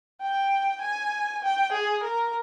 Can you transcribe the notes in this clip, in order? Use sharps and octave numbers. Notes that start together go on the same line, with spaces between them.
G5
G#5
G5
G#4
A#4